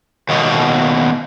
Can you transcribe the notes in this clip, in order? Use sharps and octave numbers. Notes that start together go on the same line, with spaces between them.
D#2 B2